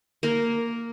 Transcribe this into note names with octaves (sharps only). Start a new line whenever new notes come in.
A#3 A#4